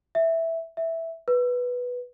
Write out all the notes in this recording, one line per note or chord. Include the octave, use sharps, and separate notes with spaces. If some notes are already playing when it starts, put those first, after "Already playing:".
E5
E5
B4